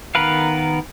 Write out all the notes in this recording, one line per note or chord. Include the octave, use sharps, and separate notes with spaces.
D#3 B3 A#4 B4 F5